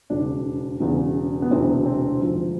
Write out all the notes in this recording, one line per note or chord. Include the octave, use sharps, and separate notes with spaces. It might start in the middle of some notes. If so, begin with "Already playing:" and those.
E1 D#2 C#3 D4
E1 E2 C#3
B3
E1 D2 C3 E3 C4
C4
E1 D2 D3 F3